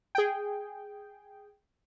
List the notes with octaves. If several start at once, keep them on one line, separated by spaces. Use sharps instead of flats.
G#4 G5